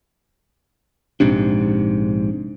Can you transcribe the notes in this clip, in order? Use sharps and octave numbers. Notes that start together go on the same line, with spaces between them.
A#1 G#2 C3 D4